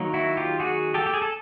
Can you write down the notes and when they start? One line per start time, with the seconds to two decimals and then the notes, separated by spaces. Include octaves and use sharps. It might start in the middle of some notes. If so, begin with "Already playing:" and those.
Already playing: D#3 F#3 A#3
0.14 E4 F#4
0.37 F4 G4
0.60 F#4 G#4
0.94 G4 A4
1.06 G4
1.14 G#4
1.22 A4